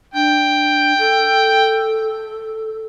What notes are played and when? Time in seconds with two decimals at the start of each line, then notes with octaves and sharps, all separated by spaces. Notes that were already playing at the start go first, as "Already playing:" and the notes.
0.14 D4 G5
0.99 A4